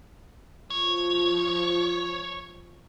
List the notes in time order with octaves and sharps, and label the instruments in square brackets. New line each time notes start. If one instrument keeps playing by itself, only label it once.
[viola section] F3 [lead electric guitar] C#5